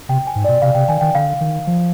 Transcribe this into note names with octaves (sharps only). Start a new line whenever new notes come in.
C3 G5
G#5
G#2
D5
B2
C3 F5
C3 G5
D#3 G#5
D#3 G5
D3 F5
D#3
F3